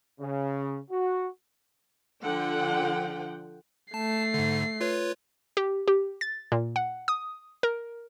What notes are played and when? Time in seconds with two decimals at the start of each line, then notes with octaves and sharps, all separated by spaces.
0.20 C#3
0.91 F#4
2.23 D3 F3 F#5 G5
3.94 A3 A5 C7
4.34 G#2 D3
4.81 F4 B4 C#5
5.57 G4
5.88 G4
6.21 A6
6.52 A#2
6.76 F#5
7.08 D#6
7.63 A#4